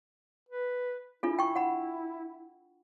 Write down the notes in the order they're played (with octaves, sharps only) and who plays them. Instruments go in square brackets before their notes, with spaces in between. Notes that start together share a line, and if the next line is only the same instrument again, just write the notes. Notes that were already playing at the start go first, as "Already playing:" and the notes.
[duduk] B4
[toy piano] D4 F4 A4 [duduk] E4
[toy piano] G5 C#6
F#5 B5